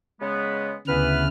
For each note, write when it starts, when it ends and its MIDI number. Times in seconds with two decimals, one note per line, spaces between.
0.20 0.75 49
0.20 0.75 56
0.20 0.75 59
0.87 1.28 38
0.87 1.28 49
0.87 1.25 52
0.87 1.25 59
0.87 1.25 71
0.87 1.28 89